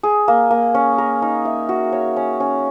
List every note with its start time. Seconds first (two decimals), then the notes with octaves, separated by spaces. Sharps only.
0.03 G#4
0.28 A#3
0.51 A#3
0.74 C#4
0.98 A#4
1.22 D#4
1.45 E5
1.69 F#4
1.92 C#5
2.17 C#4
2.40 C#4